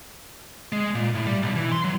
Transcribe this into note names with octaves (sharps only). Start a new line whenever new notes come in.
G#3
A#2
A2
G3
B1
E3
C6
F#3